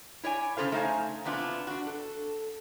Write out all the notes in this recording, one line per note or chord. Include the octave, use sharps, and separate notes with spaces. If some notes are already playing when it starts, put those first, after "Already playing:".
E4 C#5 D5 G#5
C#3 G3 A4 C5 F5
A3 D#4 C5 F5 G#5
C3 E3 B3 D4 F4
D4 F#4
A4